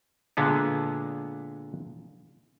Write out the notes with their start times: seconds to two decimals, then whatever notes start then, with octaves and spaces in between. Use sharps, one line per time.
0.37 A#2 D3 G#3 B3